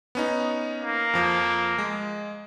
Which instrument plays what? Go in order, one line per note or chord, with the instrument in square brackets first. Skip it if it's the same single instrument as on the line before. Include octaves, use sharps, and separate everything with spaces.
[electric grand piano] B3 C#4 D#4
[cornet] A#3
[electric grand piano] F2 F3
G#3